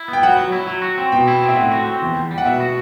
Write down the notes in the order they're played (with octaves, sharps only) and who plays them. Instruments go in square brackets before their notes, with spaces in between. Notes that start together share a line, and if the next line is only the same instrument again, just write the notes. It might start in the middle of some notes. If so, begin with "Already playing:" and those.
Already playing: [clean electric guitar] E4
B3
[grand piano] G5
[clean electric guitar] F#3 [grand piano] F#5
[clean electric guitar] F#3
E4
F#3
F#4
C4
[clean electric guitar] B2 [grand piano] G5
[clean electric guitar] E4
C4
[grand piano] E5
[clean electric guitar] A2 [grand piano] F#5
[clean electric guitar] F#4
C4
E2
E2
G3
[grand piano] F#5
[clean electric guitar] B2 [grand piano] E5
[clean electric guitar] F#4